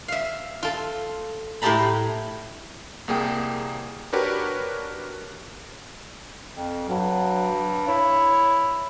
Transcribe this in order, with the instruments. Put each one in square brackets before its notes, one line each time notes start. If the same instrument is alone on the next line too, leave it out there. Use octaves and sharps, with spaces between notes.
[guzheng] E5 F5
F4 A4
A2 A3 G4 A4 A#5 B5
[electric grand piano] C2 A#3 G#4 G5
D4 F#4 G4 A#4 B4 C#5
[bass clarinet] F2
[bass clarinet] G2 [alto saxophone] F#3
[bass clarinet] E4 [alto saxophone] C#5